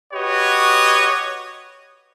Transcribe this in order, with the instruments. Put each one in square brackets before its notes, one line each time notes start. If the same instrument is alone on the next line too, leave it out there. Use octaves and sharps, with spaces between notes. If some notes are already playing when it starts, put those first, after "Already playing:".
[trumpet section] F#4 G4 B4 C#5 D#5